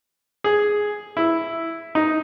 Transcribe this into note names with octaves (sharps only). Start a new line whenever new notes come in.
G#4
E4
D#4